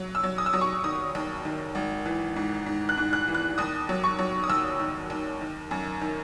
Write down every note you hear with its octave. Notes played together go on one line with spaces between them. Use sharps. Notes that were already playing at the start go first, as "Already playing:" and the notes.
Already playing: F#3
E6
F#3
D#6
E6
F#3 D#6
C#6
D#3 D#6
D#2
D#3
G#1
E3
G#2
G#2
F#6
G#2
F#6
E3
F#6
D#2 D#6
F#3
C#6
F#3
D#6
D#2 E6
D#3
D#2
D#3
F#2
D#3